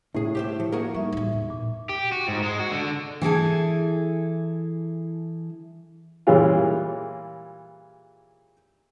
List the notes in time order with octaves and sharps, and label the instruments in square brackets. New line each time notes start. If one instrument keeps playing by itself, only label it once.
[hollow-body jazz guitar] C2 G#4 [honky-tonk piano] A2
[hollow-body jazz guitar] G4 C5 E5
F3
[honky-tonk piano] A#3 [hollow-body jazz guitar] F#4 G#4 A#4
[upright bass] G3 [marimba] D#4 E5 C#6
[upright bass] A1 F#3
E2
[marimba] A#2
[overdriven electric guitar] G4
F#4
G#2
G#3
F#4
D3
[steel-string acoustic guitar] E3 E4 G#4 A4
[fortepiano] A#2 E3 G3 G#3 C#4 F4